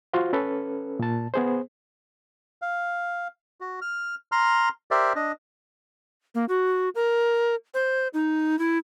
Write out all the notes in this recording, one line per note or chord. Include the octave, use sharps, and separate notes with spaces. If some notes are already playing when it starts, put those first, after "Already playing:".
F4 F#4 C5
C#4 A4 B4
A#2 A5
B3 G#4 C5
F5
F#4
F6
A#5 C6 F6
G4 A#4 C5 D5 E5
D4 D#5
A#3
F#4
A#4
C5
D#4
E4